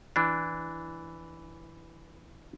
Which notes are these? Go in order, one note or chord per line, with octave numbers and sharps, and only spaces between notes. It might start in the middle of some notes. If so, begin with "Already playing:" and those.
E3 D4